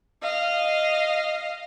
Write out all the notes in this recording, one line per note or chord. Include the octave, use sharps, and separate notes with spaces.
D#5 F5